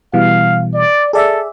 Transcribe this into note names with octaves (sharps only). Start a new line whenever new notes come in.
B2 E3 G3 F5
D5
G#4 A4 D5 E5